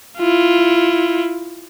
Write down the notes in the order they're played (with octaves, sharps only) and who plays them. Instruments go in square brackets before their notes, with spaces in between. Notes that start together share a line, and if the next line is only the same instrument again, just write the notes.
[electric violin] E4 F4